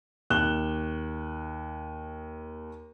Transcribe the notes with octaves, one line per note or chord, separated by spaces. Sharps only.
D#2 F#6 E7 G7